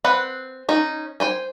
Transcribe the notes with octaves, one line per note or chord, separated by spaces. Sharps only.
C4 B4 F#5
C#4 D#4
C5 G5 G#5